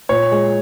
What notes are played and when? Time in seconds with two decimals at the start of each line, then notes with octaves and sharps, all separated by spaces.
0.09 A#2 C#5
0.32 G#3